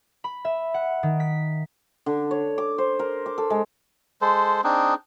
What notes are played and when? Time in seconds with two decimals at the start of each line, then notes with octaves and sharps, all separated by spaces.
0.24 B5
0.45 E5
0.74 F#5
1.03 D#3
1.20 B6
2.06 D3
2.31 C#5
2.58 D6
2.78 C5
2.99 A#4
3.26 D6
3.38 A4
3.50 G#3
4.22 G#3 A4 C5
4.64 C4 D4 D#4 G#4